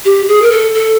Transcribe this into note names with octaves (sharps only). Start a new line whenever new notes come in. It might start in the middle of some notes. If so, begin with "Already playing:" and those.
G4
G#4
A#4
A4
A4